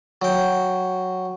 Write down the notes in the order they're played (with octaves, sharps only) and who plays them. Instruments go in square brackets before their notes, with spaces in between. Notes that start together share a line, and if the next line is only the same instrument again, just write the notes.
[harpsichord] F#3 G5